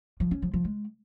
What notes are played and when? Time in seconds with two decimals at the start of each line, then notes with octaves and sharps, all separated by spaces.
0.20 F3
0.31 C#4
0.42 F3
0.53 F3
0.65 G#3